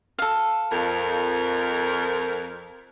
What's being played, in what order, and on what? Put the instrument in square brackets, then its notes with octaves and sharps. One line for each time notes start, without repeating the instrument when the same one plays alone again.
[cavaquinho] A4 F5
[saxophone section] F2 A#4